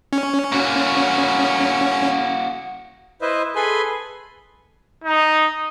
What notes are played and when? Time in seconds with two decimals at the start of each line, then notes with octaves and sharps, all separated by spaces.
0.13 C#4
0.52 A#3 F#4
3.22 E4 B4 C5 D#5 E5
3.56 G#4 A4 B4 G#5 B5 C6
5.04 D#4